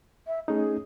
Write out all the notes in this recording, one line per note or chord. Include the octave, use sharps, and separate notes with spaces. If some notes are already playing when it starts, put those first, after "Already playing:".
E5
A3 C#4 D#4 G#4